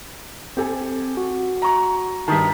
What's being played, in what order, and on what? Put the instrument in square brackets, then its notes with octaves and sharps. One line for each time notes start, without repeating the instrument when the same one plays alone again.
[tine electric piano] C4 [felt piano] G4 A4 G#5
[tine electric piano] F#4
[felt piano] A#5 C#6
[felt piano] G2 D#3 [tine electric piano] A5 D#6 B6